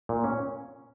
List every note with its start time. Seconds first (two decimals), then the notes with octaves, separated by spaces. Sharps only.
0.09 A#2
0.24 C#4